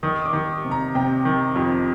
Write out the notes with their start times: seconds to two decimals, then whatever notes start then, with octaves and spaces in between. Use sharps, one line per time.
0.03 D#3 D#6
0.22 D#6
0.26 D6
0.33 D#3
0.64 C3
0.71 A#5
0.95 C3 G5
1.25 D#3
1.56 F2